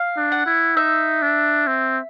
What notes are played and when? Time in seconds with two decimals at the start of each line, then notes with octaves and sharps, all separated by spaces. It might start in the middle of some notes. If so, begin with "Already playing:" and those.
Already playing: F5
0.17 D4
0.32 F#5
0.46 E4
0.76 D#4 E5
1.22 D4
1.67 C4